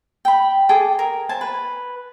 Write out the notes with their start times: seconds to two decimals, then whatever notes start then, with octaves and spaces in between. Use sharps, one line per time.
0.25 G5 B5
0.69 G#4 A4 G5 D6
0.99 A#4
1.29 C5 G#5 A5
1.41 B4